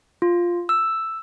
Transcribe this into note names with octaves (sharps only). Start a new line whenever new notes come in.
F4
E6